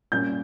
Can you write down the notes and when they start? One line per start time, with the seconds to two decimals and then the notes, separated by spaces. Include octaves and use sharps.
0.12 A#2 G3 A#3 C#4 G6